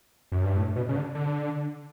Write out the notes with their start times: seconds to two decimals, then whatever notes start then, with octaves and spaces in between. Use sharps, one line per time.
0.32 F#2
0.44 G2
0.57 A2
0.76 B2
0.89 C#3
0.96 D3
1.15 D3